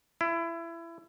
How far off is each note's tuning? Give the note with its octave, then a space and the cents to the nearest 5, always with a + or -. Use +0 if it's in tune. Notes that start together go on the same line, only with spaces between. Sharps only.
E4 +25